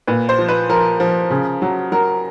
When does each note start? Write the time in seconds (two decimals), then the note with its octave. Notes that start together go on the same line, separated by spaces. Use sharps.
0.07 A#2 B4
0.29 C5
0.38 F3
0.48 B4
0.69 F3 A#4
1.00 F3
1.31 C#3
1.62 F#3
1.92 F#3 A#4